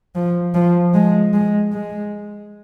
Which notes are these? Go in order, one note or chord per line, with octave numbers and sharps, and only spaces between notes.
F3
F3
G#3
G#3
G#3